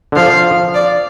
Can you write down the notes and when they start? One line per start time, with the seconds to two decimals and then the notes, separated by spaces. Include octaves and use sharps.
0.12 D3
0.16 F3 F5
0.74 D5